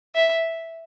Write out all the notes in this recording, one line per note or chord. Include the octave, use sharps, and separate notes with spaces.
E5